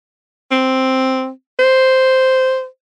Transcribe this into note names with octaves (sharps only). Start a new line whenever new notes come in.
C4
C5